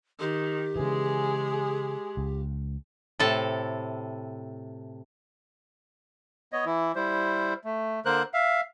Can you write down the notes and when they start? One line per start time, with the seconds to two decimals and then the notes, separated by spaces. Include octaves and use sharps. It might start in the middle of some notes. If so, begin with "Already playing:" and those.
0.20 D#3 G4
0.76 C#3 E3 G#3 G#4
2.17 C#2
3.19 A2 C3 A4
6.53 B3 C#5 D#5
6.66 E3 E4
6.95 G3 E4 C5
7.64 A3
8.05 D3 A#3 A#4 C5 F#6
8.34 E5 F5